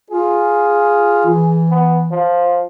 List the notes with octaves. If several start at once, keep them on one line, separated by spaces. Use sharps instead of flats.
F4 G#4
E3
B3
F3